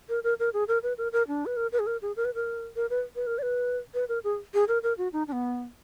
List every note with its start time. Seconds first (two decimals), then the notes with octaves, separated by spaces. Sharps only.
0.09 A#4
0.24 A#4
0.39 A#4
0.53 G#4
0.68 A#4
0.83 B4
0.98 A#4
1.12 A#4
1.28 D4
1.46 B4
1.57 A#4
1.72 B4
1.79 G#4
1.87 A#4
2.02 G#4
2.16 A#4
2.25 B4
2.35 A#4
2.76 A#4
2.90 B4
3.16 B4
3.27 A#4
3.38 D5
3.43 B4
3.94 B4
4.09 A#4
4.24 G#4
4.54 G#4
4.68 A#4
4.83 A#4
4.98 F#4
5.13 D#4
5.28 D4
5.32 B3